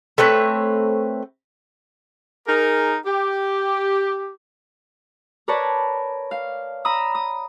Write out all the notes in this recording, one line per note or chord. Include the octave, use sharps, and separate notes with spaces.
A3 C4 B4 C#5
D#4 G#4 A#4
G4
A#4 B4 C#5 D5 A5 B5
F5
A#5 B5 D#6 E6
D#6